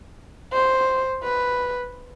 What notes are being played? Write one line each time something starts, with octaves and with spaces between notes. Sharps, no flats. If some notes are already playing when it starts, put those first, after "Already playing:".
C5
B4